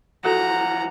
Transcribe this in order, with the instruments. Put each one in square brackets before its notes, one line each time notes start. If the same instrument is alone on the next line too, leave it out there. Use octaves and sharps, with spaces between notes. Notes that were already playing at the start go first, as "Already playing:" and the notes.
[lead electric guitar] E3 F3 [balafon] F#4 A4 [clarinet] F#5 [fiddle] A#5